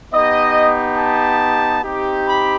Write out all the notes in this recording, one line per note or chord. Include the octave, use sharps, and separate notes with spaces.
B3 D#4 G4 D#5
A5
C4 D#4 G4
B5